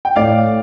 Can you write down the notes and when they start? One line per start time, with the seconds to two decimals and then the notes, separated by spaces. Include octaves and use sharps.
0.05 G5
0.16 A2 D5 F5